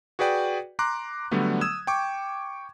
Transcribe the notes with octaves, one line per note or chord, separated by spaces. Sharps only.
F#4 G#4 B4 D5 G5
A#5 C6 D6 F#6
D3 F#3 G3 A3 B3
D#6 E6 G#6 E7
G5 C#6 D6